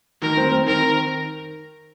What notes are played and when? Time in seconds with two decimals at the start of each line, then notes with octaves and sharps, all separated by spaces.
0.22 D#3 A#4
0.37 C4
0.52 C4
0.67 D#3 A#4
0.82 D#3